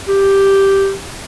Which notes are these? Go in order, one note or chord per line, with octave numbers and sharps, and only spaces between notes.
G4